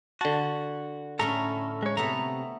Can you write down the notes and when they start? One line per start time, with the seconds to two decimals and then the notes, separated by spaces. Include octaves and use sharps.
0.21 D3 F#4 A5
1.19 A2 A3 C#4 A4 A#5
1.83 G#3 C#5
1.97 C3 A3 B3 A4 A#5